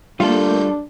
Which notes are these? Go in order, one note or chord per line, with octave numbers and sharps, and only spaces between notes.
G3 A3 A#3 D4 F4 A4 G6